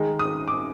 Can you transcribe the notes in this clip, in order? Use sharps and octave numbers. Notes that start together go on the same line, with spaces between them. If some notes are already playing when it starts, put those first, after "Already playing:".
Already playing: D#3 G#3 D#4
D#6
D6